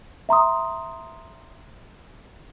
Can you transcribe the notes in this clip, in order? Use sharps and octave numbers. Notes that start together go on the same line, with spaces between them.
E5 A#5 C6 D#6